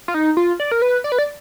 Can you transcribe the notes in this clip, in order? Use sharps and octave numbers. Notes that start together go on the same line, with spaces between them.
F4
D#4
F4
D5
A#4
B4
D5
B4
D5